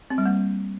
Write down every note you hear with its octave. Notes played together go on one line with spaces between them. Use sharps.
C4
G3
A#3